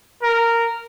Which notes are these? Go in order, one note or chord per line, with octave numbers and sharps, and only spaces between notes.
A#4